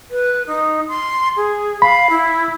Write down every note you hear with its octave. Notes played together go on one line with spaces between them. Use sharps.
B4
D#4
C6
G#4
F5 B5
E4